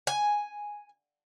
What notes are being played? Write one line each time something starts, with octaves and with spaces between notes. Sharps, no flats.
G#5